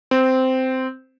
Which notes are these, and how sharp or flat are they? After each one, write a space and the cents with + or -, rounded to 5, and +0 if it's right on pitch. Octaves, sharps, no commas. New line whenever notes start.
C4 -10